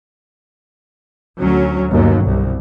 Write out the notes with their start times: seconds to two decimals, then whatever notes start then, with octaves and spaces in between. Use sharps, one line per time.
1.40 D2 F#3 C#4
1.90 G1 D#2 B2 F#3
2.25 C2